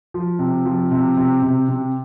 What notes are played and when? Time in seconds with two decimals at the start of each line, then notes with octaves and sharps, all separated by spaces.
0.14 F3
0.39 C3
0.65 F3
0.91 C3
1.17 C3
1.42 C3
1.69 C3